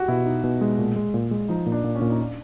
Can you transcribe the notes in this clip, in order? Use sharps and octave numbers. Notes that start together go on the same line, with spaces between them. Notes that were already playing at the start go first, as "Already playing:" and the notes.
Already playing: F#4 G4
B2 E4
D#4
B2
G#3
A#2
G#3
A#2
G#3
F3 D#4
A#2
D4
A#2
C#4
A#2
D#4
D4